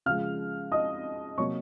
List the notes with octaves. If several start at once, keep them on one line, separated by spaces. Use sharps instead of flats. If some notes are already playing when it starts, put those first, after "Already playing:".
C#3 F3 G#3 F5 F6
D#5 D#6
C3 F#3 A#3 C#5 C#6